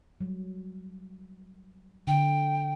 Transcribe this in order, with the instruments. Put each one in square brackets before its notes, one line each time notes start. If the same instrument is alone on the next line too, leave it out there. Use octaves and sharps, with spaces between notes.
[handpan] F#3 G3
[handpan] D3 [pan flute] G5